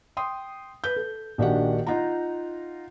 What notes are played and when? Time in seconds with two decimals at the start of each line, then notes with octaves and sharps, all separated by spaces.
0.17 G5 C6 D#6
0.84 B4 G6
0.96 A4
1.38 A#1 D#3 D4 F#4 G4 F#5
1.87 D#4 F4 F#5 A#5